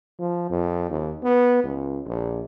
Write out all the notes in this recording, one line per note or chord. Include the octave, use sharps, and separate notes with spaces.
F3
F2
D#2
B3
C#2
A#1